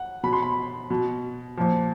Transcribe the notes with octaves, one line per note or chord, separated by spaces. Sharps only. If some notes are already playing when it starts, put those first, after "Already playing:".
Already playing: F#5
B2 B5
C6
B5
B2
A#2 F3